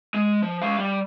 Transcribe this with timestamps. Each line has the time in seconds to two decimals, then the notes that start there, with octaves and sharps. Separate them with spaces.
0.14 G#3
0.43 F3
0.62 G#3 F5
0.78 G3